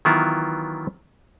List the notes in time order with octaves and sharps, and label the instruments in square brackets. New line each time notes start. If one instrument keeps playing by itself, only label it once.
[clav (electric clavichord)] D#3 E3 F#3 B3 E4 F4